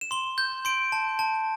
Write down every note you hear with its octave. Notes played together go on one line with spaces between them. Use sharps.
E7
C6 G7
G6
C6 D7
A5
A5